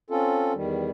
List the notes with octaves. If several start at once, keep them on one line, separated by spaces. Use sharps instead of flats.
C4 C#4 F4 A4
E2 D#3 G3